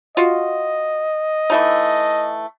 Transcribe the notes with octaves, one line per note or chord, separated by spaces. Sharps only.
F4 F#4 D#5
E3 A3 D#4